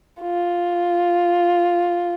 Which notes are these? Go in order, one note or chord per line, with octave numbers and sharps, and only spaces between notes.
F4